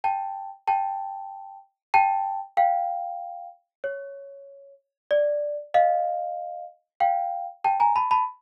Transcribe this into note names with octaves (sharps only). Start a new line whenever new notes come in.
G5 A5
G5 A5
G5 A5
F5 G5
C#5
D5
D#5 F5
F5 G5
G5 A5
G#5 A#5
A5 B5
A5 B5